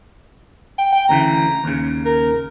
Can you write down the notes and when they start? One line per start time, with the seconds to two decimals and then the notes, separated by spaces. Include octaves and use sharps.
0.78 G5
0.92 G5
1.09 D2 C#3 E3 A#5
1.64 D#2 C#3
2.05 A#4